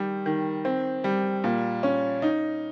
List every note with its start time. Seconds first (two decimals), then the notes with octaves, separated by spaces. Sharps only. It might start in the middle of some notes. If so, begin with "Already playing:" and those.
Already playing: D#3 G3
0.26 D#3
0.65 C4
1.04 G3
1.44 A#2
1.83 C#4
2.22 D#4